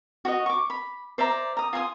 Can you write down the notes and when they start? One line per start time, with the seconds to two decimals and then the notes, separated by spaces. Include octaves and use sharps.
0.25 F#4 C#5 D#5
0.46 C#6 D6
0.70 B5
1.18 C5 D5 E5 A#5
1.57 A#5 D#6
1.73 F4 G#5 C6 D#6